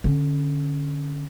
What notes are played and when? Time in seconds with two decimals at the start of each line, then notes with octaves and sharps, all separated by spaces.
0.04 D3 C#4